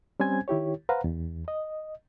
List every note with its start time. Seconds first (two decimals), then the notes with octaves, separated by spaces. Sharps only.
0.20 G3 C4 C#4 C5 G#5 G#6
0.48 D#3 E4 G4 C#5
0.89 B4 C5 F5 F#5 A#5
1.04 E2
1.48 D#5